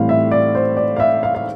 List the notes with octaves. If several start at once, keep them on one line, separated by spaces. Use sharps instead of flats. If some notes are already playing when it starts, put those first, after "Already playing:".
Already playing: A2 E3 G3 C4 E4 F5
E5
D5
C5
D5
F5
E5
F5
F5